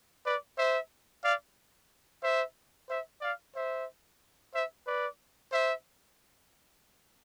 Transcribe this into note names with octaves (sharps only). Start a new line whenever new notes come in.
B4 D5
C5 E5
D5 F5
C5 E5
C5 E5
D5 F5
C5 E5
C5 E5
B4 D5
C5 E5